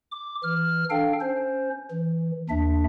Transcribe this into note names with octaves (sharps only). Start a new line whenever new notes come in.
D6
E3 F6
D4 A4 F5 G5
C#4 C5
E3
D#2 D4 E5